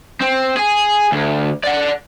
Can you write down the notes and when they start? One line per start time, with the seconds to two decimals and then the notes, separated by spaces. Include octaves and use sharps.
0.20 C4
0.57 G#4
1.12 D2
1.63 D5 F#5